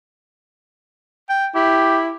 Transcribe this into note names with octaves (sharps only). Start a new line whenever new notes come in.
G5
E4 G4